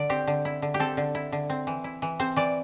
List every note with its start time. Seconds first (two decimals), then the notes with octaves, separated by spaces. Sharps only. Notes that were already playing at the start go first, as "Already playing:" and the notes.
Already playing: D3 D5
0.10 C4 G4
0.27 D3
0.45 E4
0.62 D3
0.74 G4
0.80 C4 A4
0.97 D3
1.15 E4
1.32 D3
1.50 C4
1.67 E3
1.84 E4
2.02 E3
2.20 C4 C5
2.36 E3 D5